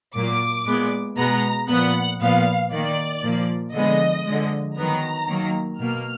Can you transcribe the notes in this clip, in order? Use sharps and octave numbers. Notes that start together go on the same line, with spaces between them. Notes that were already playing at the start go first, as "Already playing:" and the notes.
A#2 F#3 A#3 D6
A#2 G#3 B3
B2 G#3 B3 A#5
A#2 F3 B3 F#5
A#2 F3 B3 F5
D#3 A#3 D5
A#2 F3 A#3
D3 F3 G#3 B3 D#5
D3 F3 G#3
D#3 F#3 B3 A#5
D#3 F#3 A#3
B2 A#3 F6